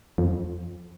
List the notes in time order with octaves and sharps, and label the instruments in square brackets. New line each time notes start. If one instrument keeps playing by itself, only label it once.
[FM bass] F2